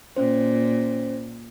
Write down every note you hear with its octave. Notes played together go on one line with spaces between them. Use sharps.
A#2 C#4 C5